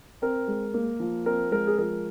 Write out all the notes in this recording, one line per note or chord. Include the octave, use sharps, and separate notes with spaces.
C4 A#4
G#3
A#3
F3
C4 A#4
G#3 A#4
G#4
F3 A#4